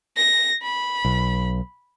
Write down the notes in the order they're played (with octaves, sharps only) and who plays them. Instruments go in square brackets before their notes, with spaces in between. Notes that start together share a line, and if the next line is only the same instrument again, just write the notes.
[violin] A#6
B5
[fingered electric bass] B1